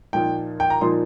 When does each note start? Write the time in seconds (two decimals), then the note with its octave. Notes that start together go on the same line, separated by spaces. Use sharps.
0.13 A#2 F3 A#3 D#4 G5
0.60 G5
0.70 A#5
0.81 A#2 F3 D#4 C6